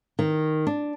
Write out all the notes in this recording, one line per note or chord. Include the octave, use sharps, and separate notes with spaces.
D#3
D4